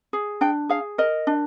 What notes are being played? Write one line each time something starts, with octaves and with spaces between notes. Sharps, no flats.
G#4
D4 G5
G#4 F5
A#4 D#5
D4